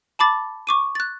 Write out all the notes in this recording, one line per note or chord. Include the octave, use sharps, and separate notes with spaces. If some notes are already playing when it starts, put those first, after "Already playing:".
A5 B5 D6 A6
C#6 D6 D#7
F#6 A6